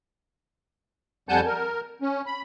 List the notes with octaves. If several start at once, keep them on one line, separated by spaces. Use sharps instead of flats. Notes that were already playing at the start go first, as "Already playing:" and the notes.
F2 G3 F#5 G#5 A5 G6
A#4
C#4
B5